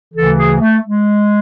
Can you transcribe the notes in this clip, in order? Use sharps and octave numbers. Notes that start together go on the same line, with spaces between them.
D2 C#3 E3 A4
G#4
A3
G#3